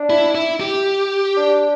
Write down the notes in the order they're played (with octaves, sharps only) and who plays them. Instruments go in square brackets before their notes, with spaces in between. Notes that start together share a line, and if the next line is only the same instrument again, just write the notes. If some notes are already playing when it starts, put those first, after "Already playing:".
Already playing: [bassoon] D4
[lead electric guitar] E4
E4
G4
[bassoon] D4